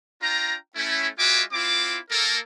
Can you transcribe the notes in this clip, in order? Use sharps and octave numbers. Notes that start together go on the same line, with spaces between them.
D4 F4 G5 A#5
A3 C#4 E4
G#3 F4 F#4 E5 G#5 D6
C4 E4 F4 D6
A#3 A4 A#4